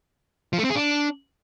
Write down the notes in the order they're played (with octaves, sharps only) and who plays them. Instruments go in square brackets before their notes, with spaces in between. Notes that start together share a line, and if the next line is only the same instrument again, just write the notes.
[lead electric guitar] F3
A3
C4
G#4
D4